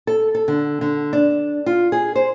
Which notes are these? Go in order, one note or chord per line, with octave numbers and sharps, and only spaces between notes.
A4
A4
D3
D3
D4
F4
G#4
C5